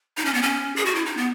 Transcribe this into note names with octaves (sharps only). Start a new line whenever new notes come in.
D#4
C#4
B3
C#4
G#4
F#4
E4
D#4
B3